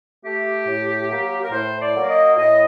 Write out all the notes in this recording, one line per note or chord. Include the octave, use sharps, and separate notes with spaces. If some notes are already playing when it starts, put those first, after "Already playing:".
A3 G4
A2
F#3 A#3
A#4
A2 C5
D5
F#3 A#3
D#5
A2 D#5